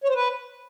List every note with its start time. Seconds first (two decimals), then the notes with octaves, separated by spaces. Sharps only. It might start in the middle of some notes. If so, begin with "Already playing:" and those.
0.04 C#5
0.09 C5
0.15 B4